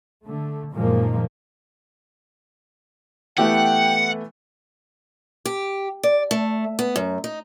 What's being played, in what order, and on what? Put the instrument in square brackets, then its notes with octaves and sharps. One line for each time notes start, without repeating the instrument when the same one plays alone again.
[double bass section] D3 A3
F#2 A#2 D#3 F3 G#3 A#3
[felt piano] E3 A3 B3 [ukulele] G4 [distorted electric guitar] F#5 [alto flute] G5
[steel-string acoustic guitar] G4
D5
A3
B3
F#2
D#4